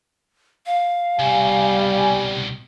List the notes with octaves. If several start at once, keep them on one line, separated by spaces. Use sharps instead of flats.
F5
C2 B2 G3 G#5